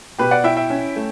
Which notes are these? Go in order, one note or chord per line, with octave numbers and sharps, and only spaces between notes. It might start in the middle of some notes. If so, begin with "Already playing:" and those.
B2 G4 B4
D5 F#5
E4 E5 G5
E5 G5
C#4
A3